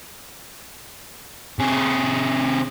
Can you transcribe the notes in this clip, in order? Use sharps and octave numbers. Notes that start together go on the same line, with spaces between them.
C3 G#4